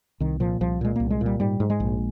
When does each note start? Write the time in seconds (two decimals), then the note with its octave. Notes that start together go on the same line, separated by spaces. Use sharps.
0.20 C2 D#3
0.40 A#2 F3
0.61 C2 F3
0.81 A#2 G#3
0.96 C2 A#3
1.10 G#3
1.21 A#2 G3
1.40 G#2 G3
1.60 G#2
1.70 G#3
1.80 A#1